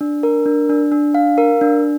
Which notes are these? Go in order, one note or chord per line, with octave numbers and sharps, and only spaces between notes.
D4
A#4
D4
D4
D4
F5
A#4
D4